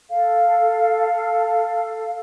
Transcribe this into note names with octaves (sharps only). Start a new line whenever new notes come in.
A4 F5